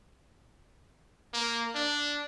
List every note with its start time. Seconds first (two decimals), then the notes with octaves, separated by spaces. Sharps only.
1.33 A#3
1.75 D4